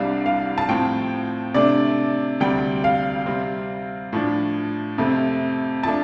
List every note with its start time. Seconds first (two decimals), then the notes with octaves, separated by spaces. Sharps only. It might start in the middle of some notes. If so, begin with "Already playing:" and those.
Already playing: C2 C3 G3 D4 F5
0.26 F5
0.58 A5
0.69 A2 F3 C4 G5
1.54 C3 A3 D4 D5
2.40 D2 C3 G3 G5
2.84 F5
3.26 C3 G3 C4
4.13 A2 F3 D4
4.98 F2 C3 A3 C4
5.83 F3 A3 D4 A5